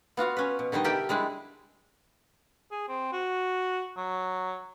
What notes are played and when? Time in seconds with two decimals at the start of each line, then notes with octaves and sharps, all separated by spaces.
0.17 B3 F4 F#4 F5
0.37 C#4 B4
0.59 B2
0.72 D3 D#3 G3 D#4 D#5
0.84 G4 A4 A#4 D5 E5 G5
1.09 G3 G#3 D4 E4
2.71 G#4
2.89 C4
3.13 F#4
3.97 F#3